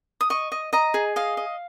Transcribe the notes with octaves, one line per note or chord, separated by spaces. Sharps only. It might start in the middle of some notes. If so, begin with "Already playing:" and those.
D#6
D#5 C#6
D#5
D#5 A#5
G#4
D#5 F5
D#5